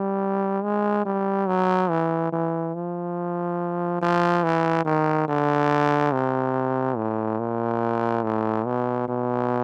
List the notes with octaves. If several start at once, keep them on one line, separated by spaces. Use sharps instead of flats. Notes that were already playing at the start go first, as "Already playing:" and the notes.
Already playing: G3
G#3
G3
F#3
E3
E3
F3
F3
E3
D#3
D3
C3
A2
A#2
A2
B2
B2